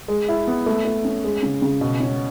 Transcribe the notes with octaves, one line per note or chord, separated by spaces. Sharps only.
G#3
E4
B3
A3
A3
C#4
G#3
C#3
C#3
B2
C#4